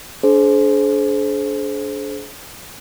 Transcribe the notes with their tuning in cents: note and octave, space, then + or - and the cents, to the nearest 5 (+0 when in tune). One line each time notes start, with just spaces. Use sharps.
D4 -25 G#4 +40 C5 +0